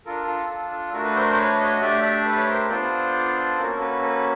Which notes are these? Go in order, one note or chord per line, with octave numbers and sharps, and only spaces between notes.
D4 F4 A4 A#4
A4
A4
A4
A3 D4 F#4 A4 A#4
A4 B4
A#4 C5
A#4 C5
B4 C#5
C#5 D#5
A3 D4 G4 D5 E5
D5 E5
A4 B4
C#5
A#4 C5
B3 D4 F4 A4 C5 D5
A#3 C#4 F#4 A4 A#4
A#4
A4 B4
A4 B4